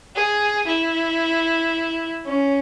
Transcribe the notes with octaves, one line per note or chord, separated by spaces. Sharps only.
G#4
E4
C#4